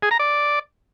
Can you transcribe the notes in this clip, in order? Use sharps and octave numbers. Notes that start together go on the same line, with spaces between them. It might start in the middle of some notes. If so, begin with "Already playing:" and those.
G#4
A#5
D5